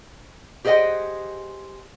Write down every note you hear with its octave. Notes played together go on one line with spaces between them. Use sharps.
G4 G#4 C5 D#5 F#5 G5